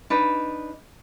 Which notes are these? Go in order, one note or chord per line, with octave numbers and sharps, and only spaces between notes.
D4 D#4 B4